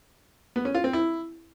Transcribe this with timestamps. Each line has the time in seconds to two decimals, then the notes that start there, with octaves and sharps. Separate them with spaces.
0.56 B3
0.65 C#4
0.75 F4
0.84 C4
0.93 E4